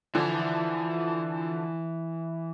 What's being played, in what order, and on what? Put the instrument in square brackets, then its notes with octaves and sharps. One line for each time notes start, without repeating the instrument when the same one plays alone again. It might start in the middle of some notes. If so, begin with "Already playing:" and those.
[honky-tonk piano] D3 F3 [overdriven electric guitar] E3 G#5